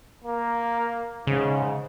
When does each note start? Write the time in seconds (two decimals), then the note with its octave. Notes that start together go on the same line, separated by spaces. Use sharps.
0.24 A#3
1.27 G#2 C#3